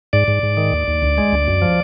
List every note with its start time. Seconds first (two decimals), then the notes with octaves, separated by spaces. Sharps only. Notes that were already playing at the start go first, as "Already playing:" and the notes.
0.13 G#2 D5
0.28 G#2
0.43 G#2
0.57 D#3
0.73 D#2
0.88 D#2
1.02 D2
1.18 G#3
1.32 D2
1.48 F#2
1.62 F3